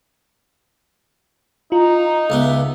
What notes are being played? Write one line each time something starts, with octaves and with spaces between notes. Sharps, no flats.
D#4 F4 A#5
C#2 B3 E5